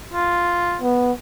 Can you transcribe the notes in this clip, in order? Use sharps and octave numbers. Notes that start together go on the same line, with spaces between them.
F4
B3